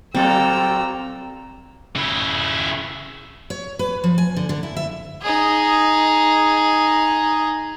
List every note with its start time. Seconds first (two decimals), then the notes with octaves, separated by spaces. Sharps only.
0.15 A#2 F#3 C4 A4 G5 A#5 E6
1.96 C#3 E4
3.50 C#5
3.79 B4
4.04 F3
4.18 G#5
4.36 D3
4.49 D3
4.63 E4
4.76 E5
5.22 D#4 G#4